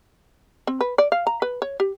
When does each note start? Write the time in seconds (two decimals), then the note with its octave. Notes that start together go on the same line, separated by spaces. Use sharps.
0.67 C4
0.81 B4
0.98 D5
1.12 F5
1.27 A#5
1.42 B4
1.62 C#5
1.80 G4